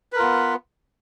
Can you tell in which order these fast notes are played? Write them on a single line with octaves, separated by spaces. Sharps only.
B4 A#4 F4 B3